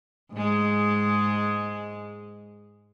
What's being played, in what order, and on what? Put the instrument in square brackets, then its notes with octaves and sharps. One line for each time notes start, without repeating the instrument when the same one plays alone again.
[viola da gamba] G#2 G#3